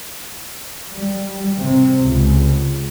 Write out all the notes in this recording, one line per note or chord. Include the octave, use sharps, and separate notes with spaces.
G3
C3
C#2